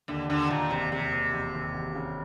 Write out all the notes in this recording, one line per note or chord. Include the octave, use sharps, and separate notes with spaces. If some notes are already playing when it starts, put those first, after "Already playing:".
D#2 D3
D#2 D3
D#2 A#2
E1 C3
E1 C3
D#2
E1
D#2
E1
C#3